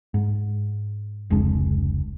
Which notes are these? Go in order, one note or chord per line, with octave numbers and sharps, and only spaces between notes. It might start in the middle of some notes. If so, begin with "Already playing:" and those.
G#2
F1 C#2 G#3 D4